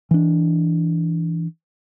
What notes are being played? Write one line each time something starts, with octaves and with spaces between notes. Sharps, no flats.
E3 D4